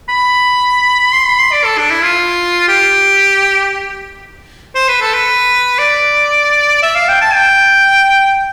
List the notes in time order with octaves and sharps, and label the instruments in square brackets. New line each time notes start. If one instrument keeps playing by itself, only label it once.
[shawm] B5
C6
B5
C6
D5
A4
D4
E4
F4
G4
C5
B4
A4
B4
D5
E5
F5
G5
A5
G5